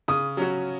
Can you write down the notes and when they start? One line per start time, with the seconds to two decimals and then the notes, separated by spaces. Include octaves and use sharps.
0.08 C#3 D#6
0.37 F#3 C#4 F#4